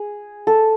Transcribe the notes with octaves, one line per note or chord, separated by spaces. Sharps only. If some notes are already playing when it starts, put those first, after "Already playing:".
Already playing: G#4
A4